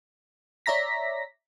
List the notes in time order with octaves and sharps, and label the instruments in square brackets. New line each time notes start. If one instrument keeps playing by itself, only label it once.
[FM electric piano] C#5 D5 E5 A#5 A#6 B6